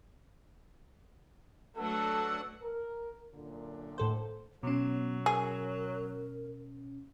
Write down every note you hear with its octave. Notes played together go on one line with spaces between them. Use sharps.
F#3 A3 D4 F#4 A4 B4 F#5 E6
A#4
F#2 A#2 D3
A2 A4 C5
B2 F#3 B3 C#4
G#4 A#4